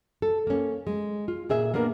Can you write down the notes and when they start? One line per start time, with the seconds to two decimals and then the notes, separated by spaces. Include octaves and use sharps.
0.22 A4
0.47 A#3 C#4
0.87 G#3
1.28 F4
1.49 A#2 G#4 E5 G#5
1.74 A#3 B3 D4 A#4